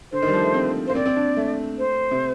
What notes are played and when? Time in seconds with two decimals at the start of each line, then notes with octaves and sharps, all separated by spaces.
0.12 D3 C5
0.22 D#3
0.28 G3
0.33 F3
0.44 A3
0.54 C4
0.87 A#3 C5
0.95 C4 D5
1.06 C4
1.16 D4
1.37 A3
1.78 C5
2.11 C3